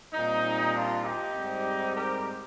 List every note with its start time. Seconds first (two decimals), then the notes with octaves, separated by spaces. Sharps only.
0.13 A#2 G3 C4 D#4
0.74 D4 F4
1.05 D#4 G4
1.35 G#2 G3 C4
1.96 G4 A#4